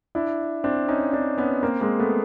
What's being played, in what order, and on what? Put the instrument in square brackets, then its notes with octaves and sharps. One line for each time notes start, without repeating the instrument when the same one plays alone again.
[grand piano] D4 E4
C4 D4
C#4 D#4
C4 D4
B3 C#4
A#3 C4
G#3 A#3
A3 B3